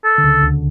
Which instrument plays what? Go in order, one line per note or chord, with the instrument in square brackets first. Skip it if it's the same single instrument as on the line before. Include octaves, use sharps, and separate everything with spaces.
[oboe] A4
[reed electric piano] D3
C#2 C#3
D2 D3